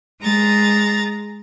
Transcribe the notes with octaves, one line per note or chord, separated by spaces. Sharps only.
G#3 A#5 A6